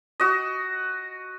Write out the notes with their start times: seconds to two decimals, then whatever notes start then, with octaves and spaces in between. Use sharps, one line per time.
0.20 F#4 D#5